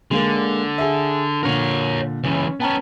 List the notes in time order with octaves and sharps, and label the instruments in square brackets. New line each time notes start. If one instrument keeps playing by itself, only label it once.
[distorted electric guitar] D3 [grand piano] G#3 A#3
[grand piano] G#4 E5
[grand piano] A#2 D3 [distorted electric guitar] A#4 C#5
[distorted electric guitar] C#2 E3 [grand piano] C#4
[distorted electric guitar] B3 C#4 [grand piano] G5 A5 A#5